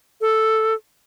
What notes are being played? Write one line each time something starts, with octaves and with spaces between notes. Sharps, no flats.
A4